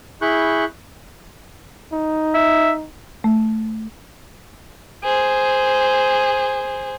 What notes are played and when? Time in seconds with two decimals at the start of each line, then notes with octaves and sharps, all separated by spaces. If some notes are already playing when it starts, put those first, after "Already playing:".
0.22 E4 G#4 B5 C#6 F#6 G6
1.93 D#4
2.34 E5
3.24 A3
5.04 G#4 C5